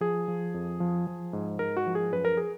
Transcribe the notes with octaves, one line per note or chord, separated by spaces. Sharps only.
F3 G#4
F3
F2
F3
F3
G#2
G#2 A#4
F#4
F3
G#4
F#2 B4
A#4
G#4